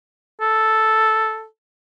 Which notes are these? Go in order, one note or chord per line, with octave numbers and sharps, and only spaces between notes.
A4